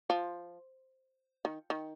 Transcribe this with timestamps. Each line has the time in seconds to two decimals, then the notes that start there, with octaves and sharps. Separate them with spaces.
0.10 F3
1.45 D#3
1.70 D#3